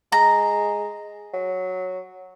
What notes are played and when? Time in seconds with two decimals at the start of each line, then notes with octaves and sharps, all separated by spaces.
0.12 G#3 A#5
1.33 F#3